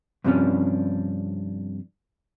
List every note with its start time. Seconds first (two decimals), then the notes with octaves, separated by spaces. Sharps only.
0.24 G2 C3 F3 G#3 C#4 D4